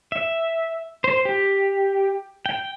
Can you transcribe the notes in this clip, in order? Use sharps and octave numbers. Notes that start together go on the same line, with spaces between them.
E5
C5
G4
G5